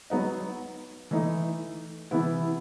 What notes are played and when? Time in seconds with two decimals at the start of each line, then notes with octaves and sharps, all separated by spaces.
0.10 F#3 B3 D#4
1.11 E3 A3 D#4
2.11 C3 E3 B3 E4